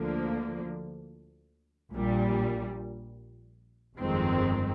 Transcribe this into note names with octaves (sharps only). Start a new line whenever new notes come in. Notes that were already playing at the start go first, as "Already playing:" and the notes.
Already playing: D2 D3 F3 A#3
A#1 A#2 G3
G1 F2 D#3 G#3 C4